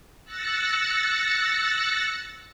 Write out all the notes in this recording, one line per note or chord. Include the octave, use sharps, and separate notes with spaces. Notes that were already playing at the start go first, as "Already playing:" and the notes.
E6 F#6 A6 A#6 C#7